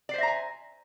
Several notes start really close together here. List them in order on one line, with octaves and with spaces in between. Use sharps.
D5 C5 E5 A#5 G#5